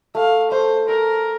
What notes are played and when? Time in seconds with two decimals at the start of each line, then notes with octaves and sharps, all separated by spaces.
0.15 A3 F5
0.51 A3 C5
0.88 A4 A#4